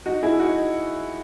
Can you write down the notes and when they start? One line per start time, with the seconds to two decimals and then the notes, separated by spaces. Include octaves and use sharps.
0.06 D#4 F#4
0.23 E4 G#4
0.40 D#4 F#4